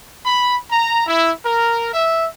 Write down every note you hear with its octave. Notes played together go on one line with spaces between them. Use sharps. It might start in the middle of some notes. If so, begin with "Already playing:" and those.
B5
A#5
E4
A#4
E5